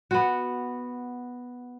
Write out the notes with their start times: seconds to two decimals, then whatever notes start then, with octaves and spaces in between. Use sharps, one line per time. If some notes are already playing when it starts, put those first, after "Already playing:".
0.11 B3 F#4